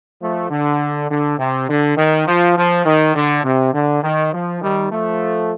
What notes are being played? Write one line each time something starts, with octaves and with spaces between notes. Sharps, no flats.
F3 A3
D3
D3
C3
D3
D#3
F3
F3
D#3
D3
C3
D3
D#3
F3
D#3 G3
F3 A3